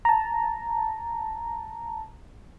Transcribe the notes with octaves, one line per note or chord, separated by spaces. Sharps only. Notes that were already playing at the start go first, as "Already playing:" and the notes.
A5 A#5